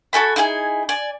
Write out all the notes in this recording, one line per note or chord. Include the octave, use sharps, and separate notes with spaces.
F#4 A4 G#5 B5
D#4 E4 G#4 G#5
D5 G#5